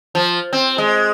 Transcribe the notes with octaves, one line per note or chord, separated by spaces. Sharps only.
F3
C4
G#3